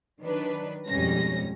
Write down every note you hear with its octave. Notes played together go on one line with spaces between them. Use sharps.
D#3 F#3 D4 B4
F2 G#2 B2 G3 C#4 A#6